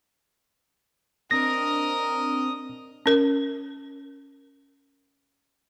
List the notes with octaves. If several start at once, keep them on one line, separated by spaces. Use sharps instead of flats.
C4 D4 A#4 D#5 D#6 A#6
C#4 A#4